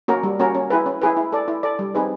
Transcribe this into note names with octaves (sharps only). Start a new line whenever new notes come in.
A#3 C#4 F#4 A#4
G3
A#3 C#4 F#4 A#4
C#4
E4 G#4 B4
C#4
E4 G#4 B4
E4
A4 D5
E4
A4 D5
G3
C4 D#4 G#4 B4